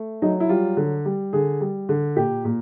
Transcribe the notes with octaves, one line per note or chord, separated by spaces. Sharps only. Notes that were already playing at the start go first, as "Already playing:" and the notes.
Already playing: A3
F#3 D#4
E4
G3 F4
D3
G3
D3 G#4
G3
D3
A#2 G4
A#2